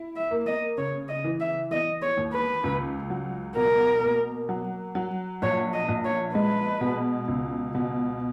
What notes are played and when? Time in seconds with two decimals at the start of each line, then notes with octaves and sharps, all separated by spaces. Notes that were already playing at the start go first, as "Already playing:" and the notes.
Already playing: E4
0.16 E5
0.31 A#3
0.46 D#5
0.78 C#3 C#5
1.08 D#5
1.24 E3
1.40 E5
1.71 E3 D#5
2.02 C#5
2.17 D#2
2.33 B4
2.64 C#2
3.10 F#3
3.56 B2 A#4
4.03 A#3
4.49 F#3
4.95 F#3
5.42 A#1 C#5
5.73 D#5
5.88 A#1
6.05 C#5
6.35 G#3 B4
6.81 B2
7.28 C#2
7.75 B2